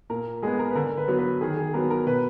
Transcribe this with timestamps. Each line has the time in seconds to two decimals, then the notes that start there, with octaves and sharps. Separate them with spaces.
0.09 A#2 A#4
0.42 G#3 B3 G#4
0.59 A#4
0.71 B4
0.75 D3 A#4
0.97 B4
1.08 F#3 B3
1.19 B4
1.41 D#3 G#4
1.57 G#4
1.74 F#3 B3 A#4
1.90 A#4
2.07 B2 B4